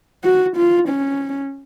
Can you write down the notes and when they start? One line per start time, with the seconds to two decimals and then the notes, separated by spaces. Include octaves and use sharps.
0.24 F#4
0.57 F4
0.89 C#4